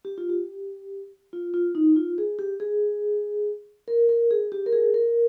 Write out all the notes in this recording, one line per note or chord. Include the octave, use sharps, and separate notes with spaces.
G4
F4
G4
F4
F4
D#4
F4
G#4
G4
G#4
A#4
A#4
G#4
G4
A#4
G#4
A#4